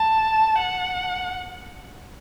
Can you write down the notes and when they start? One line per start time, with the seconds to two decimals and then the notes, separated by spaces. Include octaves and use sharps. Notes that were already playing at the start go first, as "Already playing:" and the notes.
Already playing: A5
0.58 F#5